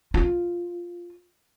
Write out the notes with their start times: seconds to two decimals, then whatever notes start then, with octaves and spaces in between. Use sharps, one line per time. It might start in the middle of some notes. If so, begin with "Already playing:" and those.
0.14 F4